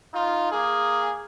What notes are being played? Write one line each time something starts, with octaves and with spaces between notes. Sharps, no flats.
D#4 F4
A#3 G#4